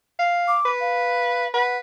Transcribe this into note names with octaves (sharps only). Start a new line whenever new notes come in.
F5
D6
B4
F5
B4 F#5